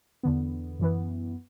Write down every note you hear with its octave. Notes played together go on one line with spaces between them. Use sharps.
E2 D3 B3
F#2 E3 B3